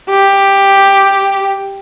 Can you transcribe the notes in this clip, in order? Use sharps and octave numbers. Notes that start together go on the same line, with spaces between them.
G4